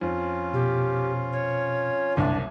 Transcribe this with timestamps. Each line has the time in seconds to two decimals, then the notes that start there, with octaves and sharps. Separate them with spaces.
0.01 F2 C#4 F4
0.54 B2 G4
1.33 C#5
2.17 F#1 C2 D4